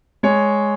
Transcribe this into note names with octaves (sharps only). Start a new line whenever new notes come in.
G#3 C#5